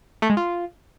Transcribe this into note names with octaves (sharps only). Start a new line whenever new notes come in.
A3
G#3
F4